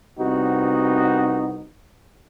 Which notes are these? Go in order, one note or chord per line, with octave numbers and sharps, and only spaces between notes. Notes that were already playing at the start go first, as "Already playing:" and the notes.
C2 C3 B3 D#4 F#4